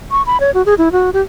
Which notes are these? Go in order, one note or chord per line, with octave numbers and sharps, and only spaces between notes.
C#6
B5
C#5
F#4
G#4
E4
F#4
G4